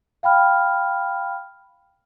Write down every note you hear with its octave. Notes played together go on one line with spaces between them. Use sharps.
F5 G5 B5 F6